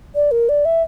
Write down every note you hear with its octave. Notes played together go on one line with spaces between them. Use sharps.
D5
A#4
D5
E5